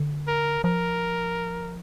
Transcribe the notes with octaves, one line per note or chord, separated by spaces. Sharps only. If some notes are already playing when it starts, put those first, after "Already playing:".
Already playing: D3
A#4
F3 A#4